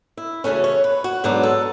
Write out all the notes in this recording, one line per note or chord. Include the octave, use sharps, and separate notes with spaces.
E4
C#3 E3 A3 C#4 F#4
C#5
B4
F#4
G#2 F#3 B3 D4
A4